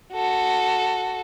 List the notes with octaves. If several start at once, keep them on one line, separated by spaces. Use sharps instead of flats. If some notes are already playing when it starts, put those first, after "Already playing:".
F#4 A4